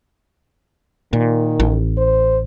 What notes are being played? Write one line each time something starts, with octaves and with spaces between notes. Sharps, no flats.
A#2 D#3
A1
C5